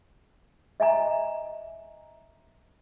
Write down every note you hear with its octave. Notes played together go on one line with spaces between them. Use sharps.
D#5 E5 G#5 A#5